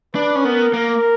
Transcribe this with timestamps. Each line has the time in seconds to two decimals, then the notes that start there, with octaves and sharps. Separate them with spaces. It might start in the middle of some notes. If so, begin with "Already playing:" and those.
0.15 D4 B4
0.35 C#4
0.44 B3 A#4
0.73 A#3 A#4